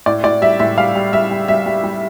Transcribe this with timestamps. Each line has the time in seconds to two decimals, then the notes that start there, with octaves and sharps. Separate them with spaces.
0.06 A2 D5
0.24 A2 D5
0.42 G3 E5
0.59 A2 E5
0.78 G3 F5
0.95 G3
1.13 G3 E5
1.31 G3
1.48 G3 E5
1.66 G3
1.84 G3